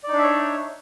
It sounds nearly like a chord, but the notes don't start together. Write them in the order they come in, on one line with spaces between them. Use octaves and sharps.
D5 D#4 D4 E5 C#5